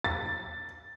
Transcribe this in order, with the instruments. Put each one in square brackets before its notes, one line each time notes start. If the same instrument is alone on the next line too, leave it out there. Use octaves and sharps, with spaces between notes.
[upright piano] A6